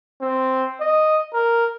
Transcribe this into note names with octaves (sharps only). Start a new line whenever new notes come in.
C4
D#5
A#4